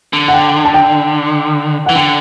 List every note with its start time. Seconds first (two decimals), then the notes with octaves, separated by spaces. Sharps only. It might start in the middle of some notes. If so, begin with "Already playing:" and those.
0.13 D3
0.28 F#5
0.34 G5
0.65 A5
0.74 G5
1.86 E3 F#5
1.96 D3 G5